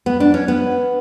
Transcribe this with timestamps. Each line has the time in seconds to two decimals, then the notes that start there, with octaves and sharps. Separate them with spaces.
0.06 B3
0.20 D4
0.34 C#4
0.48 B3